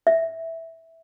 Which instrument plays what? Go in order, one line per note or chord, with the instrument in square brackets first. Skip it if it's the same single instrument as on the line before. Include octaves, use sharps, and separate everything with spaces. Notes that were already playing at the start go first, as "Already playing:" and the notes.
[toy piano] E5